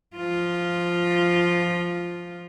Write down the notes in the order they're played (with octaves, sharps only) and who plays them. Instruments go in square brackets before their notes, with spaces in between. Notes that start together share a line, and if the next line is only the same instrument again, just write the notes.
[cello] F3 F4